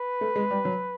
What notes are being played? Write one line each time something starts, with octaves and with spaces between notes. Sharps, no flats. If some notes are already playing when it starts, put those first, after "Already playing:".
Already playing: B4
A3
G#3
G3
F#3